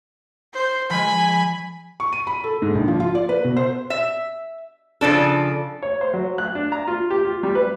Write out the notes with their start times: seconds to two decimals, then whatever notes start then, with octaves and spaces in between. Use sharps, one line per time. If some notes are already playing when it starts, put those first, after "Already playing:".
0.54 C5
0.90 F3 G#3 G#5 B5
2.00 C#6
2.12 D#7
2.27 B5
2.44 A4
2.62 G#2
2.75 A#1
2.88 F3
3.00 F4
3.15 D5
3.29 B4
3.44 B2
3.57 C5
3.90 E5
5.01 C#3 F3 D4 A4
5.83 C#5
6.01 C5
6.14 F#3
6.38 F#6
6.55 D4
6.72 A#5
6.88 F4
7.10 G4
7.25 F4
7.43 G3
7.55 B4